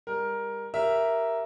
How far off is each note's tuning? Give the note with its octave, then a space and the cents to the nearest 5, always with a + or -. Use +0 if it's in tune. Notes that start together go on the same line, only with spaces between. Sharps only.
G3 +40 A#4 +10
G4 +0 A#4 +0 E5 +0